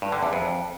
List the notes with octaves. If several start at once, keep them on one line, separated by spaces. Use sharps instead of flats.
G2
D3
E2
F2